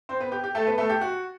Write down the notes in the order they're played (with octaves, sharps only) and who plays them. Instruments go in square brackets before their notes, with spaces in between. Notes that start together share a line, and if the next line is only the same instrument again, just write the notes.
[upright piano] C4 C5
B3 B4
G4
G4
A3 A4
B3 B4
A3 A4
G4
F#4